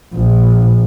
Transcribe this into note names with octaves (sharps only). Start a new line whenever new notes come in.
A#1